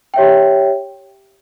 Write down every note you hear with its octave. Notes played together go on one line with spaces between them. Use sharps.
G4 C#5 E5 G5